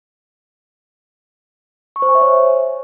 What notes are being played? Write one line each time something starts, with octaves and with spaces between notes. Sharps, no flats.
C#6
C5
G#5
E5
C#5